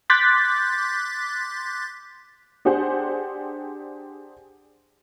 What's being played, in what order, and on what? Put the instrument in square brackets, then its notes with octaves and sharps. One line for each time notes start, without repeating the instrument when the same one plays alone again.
[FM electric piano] C6 D6 F#6 G6 A6 B6
[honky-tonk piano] D4 G4 G#4 C5 F#5